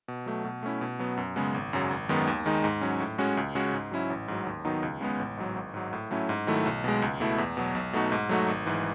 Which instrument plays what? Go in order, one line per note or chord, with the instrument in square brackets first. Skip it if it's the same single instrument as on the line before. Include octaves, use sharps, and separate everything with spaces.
[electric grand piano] B2
F#3 A3
B2
A3 C#4 E4
B2
F#3 B3
F#2
C#3 G#3 B3
G#1
F#2 C#3 F#3
G#1
F#2 D#3 G#3 B3
D#2
D#3 G#3 D#4
G#2
F#3 C#4
A2
G#3 C#4 F#4
C#2
C#3 G#3 C#4 F#4
G#2
F#3 C#4 E4
A1
G#2 F#3
D#2
D#3 F#3 B3 D#4
C#2
C#3 G#3 B3
A1
G#2 F#3
G#1
G#2 F#3
A2
F#3 A3 C#4 E4
G#2
D#3 F#3 A3 E4
B1
B2 G#3
C#2
B2 A3 E4
E2
B2 F#3
B1
B2 A3 D#4 F#4
G#2
F#3 A3 D#4 F#4
G#1
G#2 E3